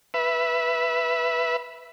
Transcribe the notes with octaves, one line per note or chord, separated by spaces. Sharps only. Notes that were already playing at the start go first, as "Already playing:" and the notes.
B4 E5